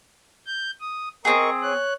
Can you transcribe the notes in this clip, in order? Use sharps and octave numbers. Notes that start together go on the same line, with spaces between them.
G6
D#6
C4 G#4 A#4 D#5 C#6
C#5 F#6